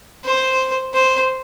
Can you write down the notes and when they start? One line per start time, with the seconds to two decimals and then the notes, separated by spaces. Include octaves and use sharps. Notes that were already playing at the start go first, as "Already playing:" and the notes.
0.24 C5
0.94 C5